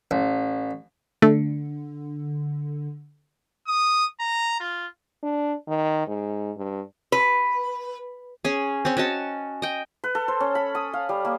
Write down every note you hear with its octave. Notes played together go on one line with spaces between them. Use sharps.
A1
D3 A3
D#6
A#5
F4
D4
D#3
G#2
G2
B4
C#4 G#4
C4 C#4
C#4 F#4 D#5 A5
D#5 G5
B4
A4
C5
C#4
B5
D#6
F5
G3
A#3